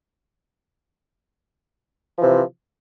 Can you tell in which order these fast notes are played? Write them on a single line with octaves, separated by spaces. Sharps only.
F3 E3 C3